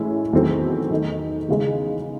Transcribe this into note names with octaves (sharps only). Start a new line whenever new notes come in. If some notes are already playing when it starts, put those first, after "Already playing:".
Already playing: A2 E3 G#3 C#4 E4
E2 D#3 F#3 A3 C4
D#3 A3 D#4
E2 C#3 G#3 D#4